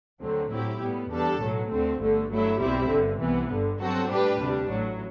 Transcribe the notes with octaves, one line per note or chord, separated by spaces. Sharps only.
D2 D3 F#3 C4
A2 F#3 C4 E4 G4
A2 G3 B3
E2 D3 G3 D4 A4
B1 A2 F#3 A3
D2 D3 A3 C4
G1 G2 D3 A3
G2 F#3 A3 E4
B1 B2 G3 C4 E4
G1 G2 D3
C2 C3 E3 B3
G1 G2 D3
G2 F#3 C4 F#4 A4
A2 G3 D4 G4 B4
D2 C3 G3 D4
A1 A2 F#3